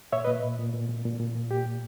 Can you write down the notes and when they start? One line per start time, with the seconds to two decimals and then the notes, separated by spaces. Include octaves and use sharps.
0.12 A#2 C#5 E5
0.24 B4 D#5
0.27 A#2
0.43 A#2
0.59 A#2
0.73 A#2
0.89 A#2
1.05 A#2
1.20 A#2
1.35 A#2
1.51 A#2 G4
1.66 A#2